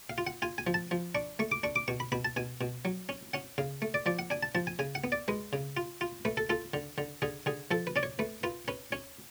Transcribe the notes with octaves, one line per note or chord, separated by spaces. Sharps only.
F5
F4
F#5
F4 G#5
G#5
F3
A5
F3
D4 C#6
A3 C#6
D6
D4 C#6
D6
B2 C#6
B5
B2 B5
A5
B2 G#5
B2
F#3
C#4
C#4 F#5
C#3 F5
A3
D5
F3 D5
F#5
D4 G#5
A5
F3 A5
G#5
C#3 G#5
F#5
B3
D5
G#3 B4
C#3
F4
F4
A3 B4
A4
F4 A4
D3
D3
D3 G#4
D3 G#4
F3 A4
B4
C#4 D5
C#5
A3 B4
F4 B4
C#4 B4
C#4 C#5